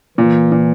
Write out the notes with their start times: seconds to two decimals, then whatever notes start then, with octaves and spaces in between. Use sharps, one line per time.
0.18 A#2 E3
0.52 A#2